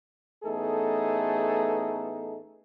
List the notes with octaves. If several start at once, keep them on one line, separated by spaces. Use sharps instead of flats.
A1 A3 B3 D#4 G#4 A4